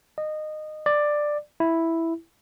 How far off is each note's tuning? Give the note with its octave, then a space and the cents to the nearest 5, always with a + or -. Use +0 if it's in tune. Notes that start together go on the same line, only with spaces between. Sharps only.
D#5 -20
D5 +10
E4 +0